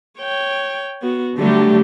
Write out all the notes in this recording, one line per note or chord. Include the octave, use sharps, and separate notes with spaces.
C#5 G5
B3 F#4
D3 F#3 G3 A3 G4